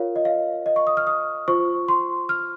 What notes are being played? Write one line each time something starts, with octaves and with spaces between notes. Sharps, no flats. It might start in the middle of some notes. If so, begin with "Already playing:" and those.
Already playing: F4 A#4 C#5 F5
D#5
F5
D#5
C#6
D#6
F6
D#6
F4 C5 C#6
C6
F6